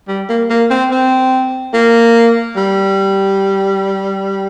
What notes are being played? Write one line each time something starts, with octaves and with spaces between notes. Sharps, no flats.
G3
A#3
A#3
C4
C4
A#3
G3